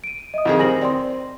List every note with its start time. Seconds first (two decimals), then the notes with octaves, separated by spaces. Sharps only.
0.04 D7 D#7
0.34 D#5 E5 D#6
0.45 F2 D#3 G#4
0.59 D#3 G3 C4 G#5 A#6 F#7
0.81 C4 D5 G5 C6